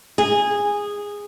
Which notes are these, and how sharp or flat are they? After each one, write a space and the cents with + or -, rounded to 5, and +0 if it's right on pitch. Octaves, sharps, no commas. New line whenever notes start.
G#4 -15